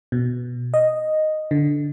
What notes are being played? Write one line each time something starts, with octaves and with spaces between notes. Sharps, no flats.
B2
D#5
D3